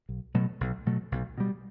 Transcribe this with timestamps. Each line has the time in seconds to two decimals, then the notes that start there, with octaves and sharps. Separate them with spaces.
0.09 B1
0.34 B2 F#3 A3
0.61 B1
0.86 B2 F#3 A3
1.12 B1
1.38 B2 G3